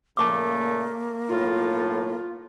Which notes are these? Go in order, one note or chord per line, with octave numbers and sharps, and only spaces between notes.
A#2 C#3 A3 A#3 A5 C#6 D6
B1 A2 F4